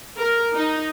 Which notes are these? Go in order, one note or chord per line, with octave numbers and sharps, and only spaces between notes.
A#4
D#4